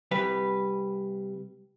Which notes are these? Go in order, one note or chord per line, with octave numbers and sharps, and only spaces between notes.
C2 G3 B4